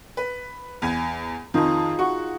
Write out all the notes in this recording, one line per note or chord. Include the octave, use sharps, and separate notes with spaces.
B4
E2 G#5
F2 D#3 D#4 F4 G#4
F#4 C#6